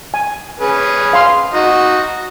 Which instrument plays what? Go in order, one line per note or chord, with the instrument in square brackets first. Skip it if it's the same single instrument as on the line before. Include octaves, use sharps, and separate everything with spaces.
[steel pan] G#5
[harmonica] C#4 G#4 B4
[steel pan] F5 C6
[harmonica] D#4 F#4